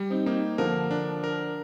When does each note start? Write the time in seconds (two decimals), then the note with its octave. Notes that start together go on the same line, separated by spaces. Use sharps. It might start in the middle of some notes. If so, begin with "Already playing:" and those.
Already playing: G3
0.10 C4 D#4
0.26 A#3 C4 D#4
0.58 D3 F3 A#4
0.91 D4
1.24 A#4